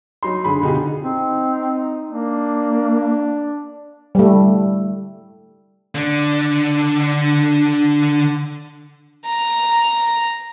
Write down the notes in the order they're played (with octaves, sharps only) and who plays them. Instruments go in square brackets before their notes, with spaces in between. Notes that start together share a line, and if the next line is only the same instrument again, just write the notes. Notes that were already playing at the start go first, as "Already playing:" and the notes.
[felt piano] F#3 D#4 C6
D3 G#4 B5
B2 D3 D#4 F4 G4 G#4
[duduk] C4 [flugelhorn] D#4
[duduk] A#3 [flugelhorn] D4
[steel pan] G3 A3
[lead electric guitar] D3 D4
[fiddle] A#5